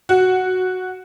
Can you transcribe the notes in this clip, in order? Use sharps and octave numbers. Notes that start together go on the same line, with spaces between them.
F#4